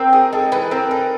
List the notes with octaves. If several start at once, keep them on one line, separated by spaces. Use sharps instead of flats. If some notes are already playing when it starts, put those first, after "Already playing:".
Already playing: C4 A#4
D#4 G#4
G#3 A4
E3 B4
C4 A#4
D#4 A4